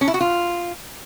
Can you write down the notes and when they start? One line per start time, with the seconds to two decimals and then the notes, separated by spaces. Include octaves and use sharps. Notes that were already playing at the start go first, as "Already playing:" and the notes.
0.01 C#4
0.08 E4
0.14 F#4
0.21 F4